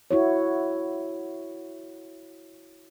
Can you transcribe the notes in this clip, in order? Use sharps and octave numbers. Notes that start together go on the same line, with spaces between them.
E4 F#4 C#5